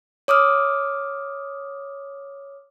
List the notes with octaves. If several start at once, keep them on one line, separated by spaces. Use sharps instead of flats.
C#5 D6 D#6 F6